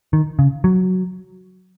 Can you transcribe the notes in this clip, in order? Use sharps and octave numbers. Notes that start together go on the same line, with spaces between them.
D#3
C#3
F#3